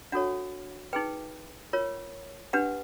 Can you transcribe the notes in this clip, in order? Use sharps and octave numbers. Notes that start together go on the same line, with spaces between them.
D4 F#4 A4 C#5 F#5
D#4 G#4 B4 G5
F4 A#4 C#5
D4 G4 B4 F#5